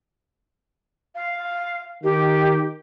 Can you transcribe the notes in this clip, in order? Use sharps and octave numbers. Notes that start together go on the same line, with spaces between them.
F5
D#3 G4